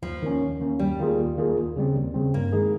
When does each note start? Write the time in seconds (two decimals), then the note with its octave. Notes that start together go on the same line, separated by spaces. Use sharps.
0.02 D#2 F3
0.22 D#3 A#3 C#4
0.41 D#2
0.60 D#3 A#3 C#4
0.79 D#2 G3
0.99 D#3 A#3 F4 G#4
1.18 D#2
1.37 D#3 A#3 F4 G#4
1.57 D#2
1.76 C#3 G3 C4
1.95 D#2
2.14 C#3 G3 C4
2.33 G2 A#3
2.53 D#3 G#3 D#4 G#4